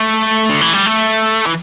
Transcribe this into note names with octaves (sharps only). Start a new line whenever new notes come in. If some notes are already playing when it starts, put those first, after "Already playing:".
Already playing: A3
D3
E3
G3
A3
E3